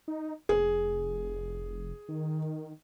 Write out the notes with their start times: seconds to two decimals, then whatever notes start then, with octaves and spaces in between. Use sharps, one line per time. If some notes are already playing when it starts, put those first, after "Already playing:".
0.08 D#4
0.49 F1 G#4
2.09 D#3